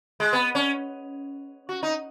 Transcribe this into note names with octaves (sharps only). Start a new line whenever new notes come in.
G#3
B3
C#4
F#4
D#4